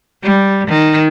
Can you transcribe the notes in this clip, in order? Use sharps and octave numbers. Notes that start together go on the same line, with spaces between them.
G3
D#3